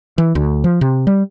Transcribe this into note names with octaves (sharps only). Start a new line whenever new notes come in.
E3
D2
F3
C3
G3